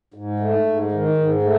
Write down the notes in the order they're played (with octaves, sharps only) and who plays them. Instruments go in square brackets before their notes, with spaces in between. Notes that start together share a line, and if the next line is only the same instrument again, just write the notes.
[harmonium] G#2
A3
G#2
D#3
G#2
A3